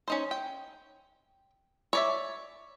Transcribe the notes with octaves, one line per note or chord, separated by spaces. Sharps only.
C#4 D#4 C5
G5
C#5 D5 E5